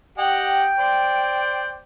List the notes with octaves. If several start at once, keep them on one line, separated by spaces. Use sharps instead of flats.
G4 D#5 F#5 G5
C5 D5